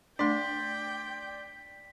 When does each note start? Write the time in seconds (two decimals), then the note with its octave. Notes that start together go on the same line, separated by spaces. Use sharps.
0.19 A3 D4 D5 G5 C6 B6